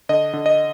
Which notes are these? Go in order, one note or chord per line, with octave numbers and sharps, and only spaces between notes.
D3 D#5
D3
D#5